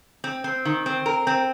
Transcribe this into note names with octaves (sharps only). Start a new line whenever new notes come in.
C4
C4
D#3
C4
A#4
C4